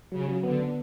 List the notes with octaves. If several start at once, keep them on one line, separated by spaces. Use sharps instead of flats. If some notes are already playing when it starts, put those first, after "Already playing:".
C#3 F#3
F#3
D3 B3
B3